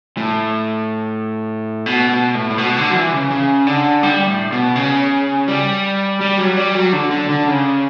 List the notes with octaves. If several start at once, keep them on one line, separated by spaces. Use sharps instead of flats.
A2
B2
B2
A2
A2
B2
D3
F#3
E3
C#3
C#3
D3
G3
A2
B2
C#3
G3
G3
F#3
G3
F#3
D3
D3
D3
C#3